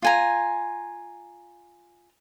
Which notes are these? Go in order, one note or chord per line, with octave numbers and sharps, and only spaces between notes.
F4 G#5 A#5